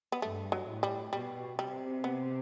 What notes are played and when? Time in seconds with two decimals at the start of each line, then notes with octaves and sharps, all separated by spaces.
0.12 B3
0.22 G2 A3
0.52 F#3
0.68 A2
0.83 G3
1.13 B2 G3
1.59 C3 G3
2.04 B3